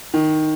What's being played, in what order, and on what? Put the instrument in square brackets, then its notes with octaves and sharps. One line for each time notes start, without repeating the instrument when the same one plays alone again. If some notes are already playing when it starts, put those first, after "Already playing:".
[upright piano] D#3